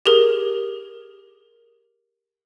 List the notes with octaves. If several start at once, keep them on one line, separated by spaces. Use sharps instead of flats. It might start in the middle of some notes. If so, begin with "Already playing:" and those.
G4 G#4 A#4